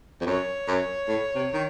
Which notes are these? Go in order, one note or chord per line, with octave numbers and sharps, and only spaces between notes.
F2
F#2 C#5
F#2
A2
C3
D#3